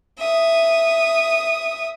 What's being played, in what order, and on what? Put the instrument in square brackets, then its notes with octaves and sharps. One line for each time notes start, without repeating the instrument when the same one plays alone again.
[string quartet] E5 D#6